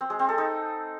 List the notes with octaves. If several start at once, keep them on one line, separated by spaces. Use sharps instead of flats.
C4
G#3
C4
A4
D#4